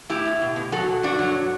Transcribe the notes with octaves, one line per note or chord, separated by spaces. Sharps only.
A2 E4 G4
A2
B2
B2
F#3 F#4 A4
B2
G2 D4 F#4
F#3